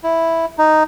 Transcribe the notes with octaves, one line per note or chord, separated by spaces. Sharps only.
E4
D#4